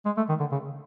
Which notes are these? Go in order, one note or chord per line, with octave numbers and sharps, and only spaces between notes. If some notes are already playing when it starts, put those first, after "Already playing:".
G#3
A3
D#3
D3
C#3